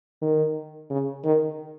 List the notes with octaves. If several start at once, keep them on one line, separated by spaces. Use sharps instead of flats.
D#3
C#3
D#3